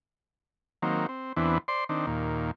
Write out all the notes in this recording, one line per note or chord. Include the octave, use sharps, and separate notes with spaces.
D#3 F#3 A#3 C4
C4
E2 E3 B3 C4 D4
C5 D5 C6
D#3 C4 D4
D#2 A#2